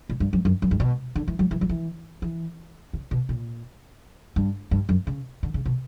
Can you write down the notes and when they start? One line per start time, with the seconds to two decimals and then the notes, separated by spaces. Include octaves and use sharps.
0.09 A#2
0.20 G2
0.33 F#2
0.45 F#2
0.62 F#2
0.71 G2
0.80 B2
1.16 D3
1.28 E3
1.39 F#3
1.51 E3
1.61 F#3
1.69 E3
2.22 E3
2.93 C#3
3.11 B2
3.29 A#2
4.36 G2
4.71 G2
4.89 F#2
5.07 C#3
5.43 D3
5.54 C#3
5.66 B2